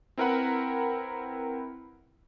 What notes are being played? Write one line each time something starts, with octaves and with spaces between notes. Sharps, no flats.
C4 E4 A#4 B4 F#5 B5